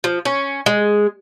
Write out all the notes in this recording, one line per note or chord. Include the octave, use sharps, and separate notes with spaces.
F3
C#4
G#3